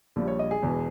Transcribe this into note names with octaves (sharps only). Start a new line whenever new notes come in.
A#1 A#2 G3
C#5
D#5
G#4
E1 E2 B2